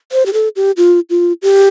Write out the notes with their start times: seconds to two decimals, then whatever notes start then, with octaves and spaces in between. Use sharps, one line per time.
0.12 C5
0.26 G4
0.33 A4
0.56 G4
0.77 F4
1.10 F4
1.42 G4